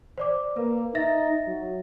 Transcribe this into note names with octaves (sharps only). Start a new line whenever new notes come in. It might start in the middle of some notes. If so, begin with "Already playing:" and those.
C5 D5 D6
A#3 B4
D#4 E5 A6 A#6
F#3